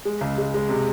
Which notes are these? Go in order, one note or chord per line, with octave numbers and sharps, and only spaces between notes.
G#3
C#2
G#3
G#3
C3